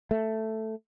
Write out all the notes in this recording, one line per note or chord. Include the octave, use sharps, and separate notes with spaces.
A3